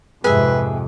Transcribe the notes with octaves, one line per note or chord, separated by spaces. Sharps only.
F2 G#2 C3 G#4 B4 E5